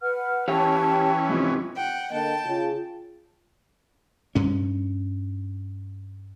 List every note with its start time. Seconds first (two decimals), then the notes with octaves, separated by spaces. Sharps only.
0.02 B4 F#5 F6
0.48 E3 C#4 G4 C#5 F5 G5 A5
1.29 G#2 C3 F3
1.75 F#5 G5
2.11 D3 A#3 D#5 G5 A5
2.46 C#3 F4
4.35 G2 C#4